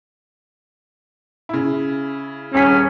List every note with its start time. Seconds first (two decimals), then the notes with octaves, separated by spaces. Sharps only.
1.49 C#3 E4
2.54 D#1 C#4 G#4 B6